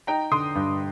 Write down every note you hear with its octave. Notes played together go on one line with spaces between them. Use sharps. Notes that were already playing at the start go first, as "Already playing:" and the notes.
D#4 G5 A#5
D3 C6 D#6
G2